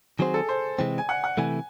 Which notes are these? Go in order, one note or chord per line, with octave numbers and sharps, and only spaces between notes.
D#3 F#3 C4 F#4 G#4 C5
A4
C5
C3 E3 G#3 C4
G#5
F#5
F#5
C3 E3 A3 G#5